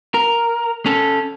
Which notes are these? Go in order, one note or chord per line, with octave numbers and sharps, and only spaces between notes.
A#4
C#4 A4